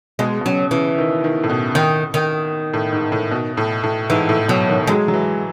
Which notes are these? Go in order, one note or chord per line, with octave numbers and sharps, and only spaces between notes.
B2 G#3
B2
C#3 F#3
C#3 E3
D#3
D#3
A2
B2
D#3
D#3
A2
G#2
A2
B2
A2
A2
G#2 E3
A2
B2 F#3
D#3
F#3 G#3
F#3
E3